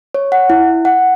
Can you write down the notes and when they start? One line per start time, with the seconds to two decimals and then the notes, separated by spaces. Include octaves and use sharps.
0.14 C#5
0.32 F#5
0.50 E4
0.85 F#5